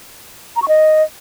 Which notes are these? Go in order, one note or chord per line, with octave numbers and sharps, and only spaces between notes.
A#5
C#6
D#5